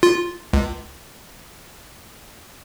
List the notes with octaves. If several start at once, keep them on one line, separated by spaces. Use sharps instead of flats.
F4
C#2